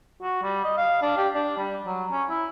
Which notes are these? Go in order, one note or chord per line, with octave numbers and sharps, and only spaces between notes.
F#4
G3
D#5
F5
D4
G4
D4
G3
F#3
C#4
E4